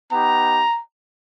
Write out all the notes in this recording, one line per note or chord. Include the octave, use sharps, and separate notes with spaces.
B3 D#4 G4 A#5